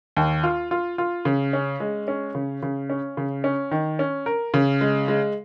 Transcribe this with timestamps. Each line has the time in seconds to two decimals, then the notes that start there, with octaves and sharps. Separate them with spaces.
0.16 D#2
0.43 F4
0.71 F4
0.98 F4
1.25 C#3
1.53 C#4
1.80 G#3
2.08 C#4
2.35 C#3
2.63 C#3
2.90 C#4
3.17 C#3
3.44 C#4
3.71 D#3
3.99 C#4
4.26 A#4
4.54 C#3
4.81 G#3
5.08 G#3